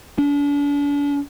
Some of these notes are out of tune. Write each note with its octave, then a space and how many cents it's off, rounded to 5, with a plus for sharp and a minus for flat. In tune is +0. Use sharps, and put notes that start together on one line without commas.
D4 -40